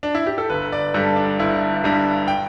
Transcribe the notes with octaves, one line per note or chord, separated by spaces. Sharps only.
D4
E4
G4
A4
G1 B4
D5
G2 G3 A4
D4
G1 E4
G2 G3
G5